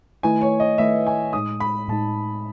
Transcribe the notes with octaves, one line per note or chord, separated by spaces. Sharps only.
D#3 A3 E4 B4 D#5 G#5
C#5
D#5
D#3 A3 E4 B4 D#5 E5
G#5
A2 G#3 D#4 D#6
B5
A2 G#3 D#4 A5